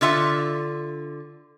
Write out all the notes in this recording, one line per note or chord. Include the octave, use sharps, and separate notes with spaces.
D3 F4 E5 F#5